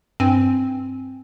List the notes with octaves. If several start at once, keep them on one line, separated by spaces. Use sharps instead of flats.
G2 C4 G#5